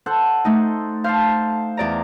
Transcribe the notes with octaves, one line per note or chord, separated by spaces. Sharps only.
A4 C5 F#5
A3 D#4
C5 F5 A5
E2 D5 A#5